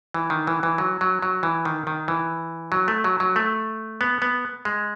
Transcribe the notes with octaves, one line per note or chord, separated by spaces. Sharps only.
E3
D#3
E3
E3
F#3
F#3
F#3
E3
D#3
D#3
E3
F#3
A3
F#3
F#3
A3
B3
B3
G#3